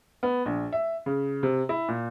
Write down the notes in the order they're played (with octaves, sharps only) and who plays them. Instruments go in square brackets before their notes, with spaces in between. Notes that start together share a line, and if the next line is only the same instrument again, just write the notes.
[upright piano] B3
A#1
E5
C#3
C3
E4
A#2